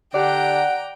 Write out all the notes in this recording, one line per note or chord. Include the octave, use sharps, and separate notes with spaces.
D3 D4 G4 D5 F#5 G5 A#5